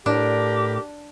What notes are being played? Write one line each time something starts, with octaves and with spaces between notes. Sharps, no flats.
A2 D4 G4 A#4